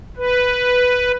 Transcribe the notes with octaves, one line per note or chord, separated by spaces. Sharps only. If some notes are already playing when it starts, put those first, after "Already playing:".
B4